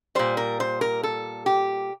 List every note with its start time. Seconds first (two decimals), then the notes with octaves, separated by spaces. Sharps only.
0.15 A#2 G3 C5
0.37 A#4
0.60 C5
0.81 A#4
1.03 A4
1.46 G4